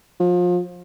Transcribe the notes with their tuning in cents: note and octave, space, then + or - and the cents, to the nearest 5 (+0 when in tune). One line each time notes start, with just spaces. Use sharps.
F3 +30